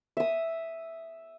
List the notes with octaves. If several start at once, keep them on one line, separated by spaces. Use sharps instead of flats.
E5 D#6